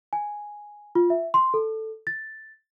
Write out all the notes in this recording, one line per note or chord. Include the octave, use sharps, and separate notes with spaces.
G#5
F4
E5
C6
A4
A6